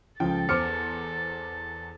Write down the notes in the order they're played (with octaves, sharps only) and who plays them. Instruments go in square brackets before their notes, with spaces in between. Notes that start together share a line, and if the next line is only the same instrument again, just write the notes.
[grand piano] C#2 F3 [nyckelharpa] A4 A5 [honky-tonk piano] G5
[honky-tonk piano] E2 C5 [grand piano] D6 F6 C#7